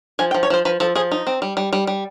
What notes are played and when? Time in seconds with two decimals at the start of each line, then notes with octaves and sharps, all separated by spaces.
0.19 F3 G#5
0.31 G5
0.34 F3
0.43 C#5
0.50 F3 C5
0.65 F3 B4
0.80 F3 A4
0.95 F3 G#4
1.11 D#4
1.27 C4
1.42 G3
1.57 G3
1.73 G3
1.87 G3